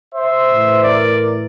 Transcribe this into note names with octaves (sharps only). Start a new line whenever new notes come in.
C5 E5
A2 E3
A#4 D5